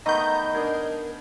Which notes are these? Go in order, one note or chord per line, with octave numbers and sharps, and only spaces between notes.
D#3 A3 B3 D#5 A#5 G6
D4 G#4 A#4